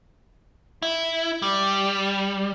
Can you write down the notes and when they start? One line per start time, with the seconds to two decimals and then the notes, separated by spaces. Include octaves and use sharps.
0.82 E4
1.42 G3